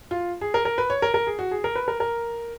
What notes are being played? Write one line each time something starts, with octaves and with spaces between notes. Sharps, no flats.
F4
G#4
A#4
A#4
B4
C#5
A#4
A#4
G#4
F#4
G#4
A#4
B4
A#4
A#4